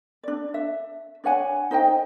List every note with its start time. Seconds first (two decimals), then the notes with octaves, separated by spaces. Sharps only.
0.23 D4 D5
0.54 E5
1.24 D4 C#5 F#5 G#5
1.71 D#4 C5 D#5 G5